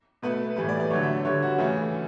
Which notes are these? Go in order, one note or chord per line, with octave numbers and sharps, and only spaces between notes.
B2 A3 B4
A2 E3 G3 B4
D5
D5
D3 F#3 A3 C#5
E5
D3 G3 C#5
F#4
C#3 E3 A3 E4